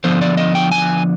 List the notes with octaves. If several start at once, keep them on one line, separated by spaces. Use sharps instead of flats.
D3 F3 B3 C5
D5
D#5
G5
G#5